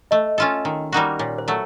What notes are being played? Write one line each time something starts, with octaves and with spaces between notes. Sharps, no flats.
A3 D#5
C#4 F4 A4
D#3
G3 A#3 D#4 F#4
A#2 C#5
C5
F#3 A3